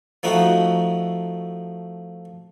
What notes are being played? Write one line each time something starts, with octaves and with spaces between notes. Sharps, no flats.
F3 A3 D#4 F#4